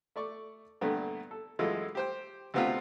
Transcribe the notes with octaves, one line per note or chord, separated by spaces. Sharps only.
A3 D5 C#6
G2 A#2 D3 A3 B3
A4
F#2 E3 G#3 A3 F4
G4 C5 G5
D2 C3 B3 C4 F4